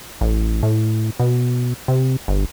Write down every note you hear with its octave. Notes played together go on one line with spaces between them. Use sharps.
A1
A2
B2
C3
G1